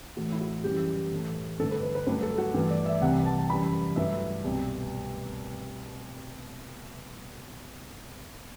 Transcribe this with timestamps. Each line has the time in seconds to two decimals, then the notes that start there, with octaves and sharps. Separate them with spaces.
0.17 A2 E3 A3 F#4
0.32 E4
0.41 F#4
0.64 F#2 E3 G3 G4
1.12 A2 E3 A3
1.59 G2 D3 A3 A4
1.71 B4
1.83 B4
1.95 B4
2.07 G2 F#3 A3 B4
2.23 A4
2.38 F#4
2.54 G2 E3 A3
2.71 D5
2.86 E5
3.01 C2 C3 E3 G3 F#5
3.26 A5
3.50 F#2 E3 G3 B5
3.96 G2 F#3 A3 E5
4.44 C2 B2 G3